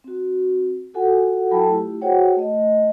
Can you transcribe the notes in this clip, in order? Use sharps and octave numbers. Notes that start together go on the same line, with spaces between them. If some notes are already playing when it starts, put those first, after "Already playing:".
C4 F#4
F4 F#4 A4 F#5 G#5
F#3 E4 A4 G5 A5 B5
A3 E4 F4 G4
F#4 G#4 C5 C#5 F#5 G5
A3 D#5